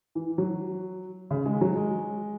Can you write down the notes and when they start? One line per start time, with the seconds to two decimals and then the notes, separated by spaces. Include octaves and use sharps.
0.15 E3
0.38 F#3
1.31 C#3
1.46 G#3
1.61 F#3
1.76 G#3